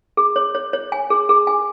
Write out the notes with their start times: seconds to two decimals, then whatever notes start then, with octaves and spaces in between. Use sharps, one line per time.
0.17 G#4
0.36 C#5
0.55 C#5
0.73 C#5
0.92 G#5
1.10 G#4
1.29 G#4
1.47 G#5